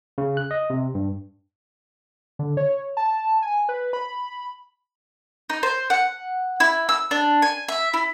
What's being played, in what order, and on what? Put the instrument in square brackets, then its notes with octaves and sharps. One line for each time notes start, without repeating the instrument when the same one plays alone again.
[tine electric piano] C#3
F#6
D#5
C3
G2
[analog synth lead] D3
C#5
A5
G#5
B4
B5
[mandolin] D#4
C5
F#5
E4
E6
D4
G#5
E5
E4